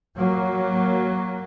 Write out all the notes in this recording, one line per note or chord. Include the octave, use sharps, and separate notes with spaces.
F#3 A#3